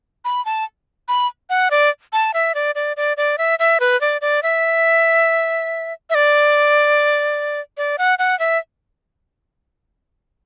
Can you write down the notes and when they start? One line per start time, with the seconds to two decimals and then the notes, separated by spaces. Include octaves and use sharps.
0.25 B5
0.45 A5
1.08 B5
1.50 F#5
1.71 D5
2.13 A5
2.34 E5
2.55 D5
2.75 D5
2.97 D5
3.17 D5
3.38 E5
3.59 E5
3.80 B4
4.01 D5
4.21 D5
4.43 E5
6.10 E5
6.15 D5
7.77 D5
7.98 F#5
8.19 F#5
8.39 E5